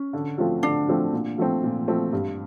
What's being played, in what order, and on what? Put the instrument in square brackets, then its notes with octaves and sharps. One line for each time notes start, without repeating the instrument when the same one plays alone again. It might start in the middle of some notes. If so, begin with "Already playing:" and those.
Already playing: [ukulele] C#4
[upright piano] D3
F3 A3 C4 F4
[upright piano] D3 [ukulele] D4
[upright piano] F3 A3 C4 F4
A#2
F3 A3 C4
A#2
F3 A3 C4
G2